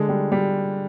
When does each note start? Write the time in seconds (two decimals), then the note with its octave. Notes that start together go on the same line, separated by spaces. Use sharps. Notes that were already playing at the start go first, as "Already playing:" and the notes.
Already playing: D3 G#3
0.09 G3
0.32 G3